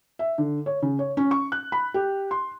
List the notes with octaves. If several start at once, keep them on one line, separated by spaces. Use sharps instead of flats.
E5
D3
C#5
C#3
C#5
C#4
C#6
F#6
B5
G4
C6